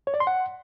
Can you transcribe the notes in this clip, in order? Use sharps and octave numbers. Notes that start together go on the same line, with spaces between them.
C#5
D5
C6
F#5